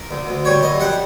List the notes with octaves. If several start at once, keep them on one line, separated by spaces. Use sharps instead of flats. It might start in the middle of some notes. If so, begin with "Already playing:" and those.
Already playing: A#4
D2
D2
G3 C#5
F#2 D#5
G3 F#5